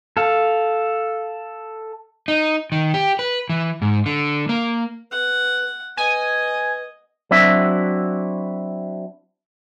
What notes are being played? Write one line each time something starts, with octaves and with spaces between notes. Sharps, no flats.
A4 F5
D#4
D#3
G4
B4
E3
G#2
D3
A#3
B4 F#5
B4 D#5 G#5
F#3 C4 D4 E4 F#4 E5